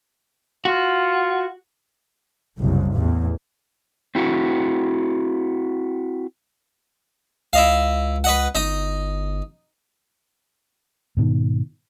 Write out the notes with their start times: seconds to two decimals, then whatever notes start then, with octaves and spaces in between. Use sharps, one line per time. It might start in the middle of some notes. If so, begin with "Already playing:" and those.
0.65 F4 F#4
2.58 F#1 C2
2.91 A1 E2
4.15 C4 E4 F#4
7.53 C#2 E4 D#5 F5
8.24 B4 D#5 F#5
8.55 G1 D#4 D#5
11.17 G#2 B2 D#3